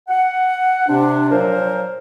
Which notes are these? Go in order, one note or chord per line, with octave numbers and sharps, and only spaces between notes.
F#5
C3 D4
A#2 F3 F#3 A#4 C5